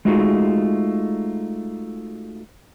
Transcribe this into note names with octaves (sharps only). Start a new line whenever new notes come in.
G#3 A3 D#4 F4 F#4 G#4